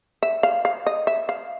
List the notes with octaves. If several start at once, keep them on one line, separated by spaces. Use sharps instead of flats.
E5
F5
F5
D#5
E5
F5